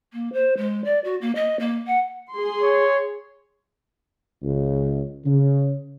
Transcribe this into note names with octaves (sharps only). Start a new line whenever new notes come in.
A#3
C5
G#3
D5
F#4
A#3
D#5
A#3
F#5
G#4 C6
C#5
C#2
C#3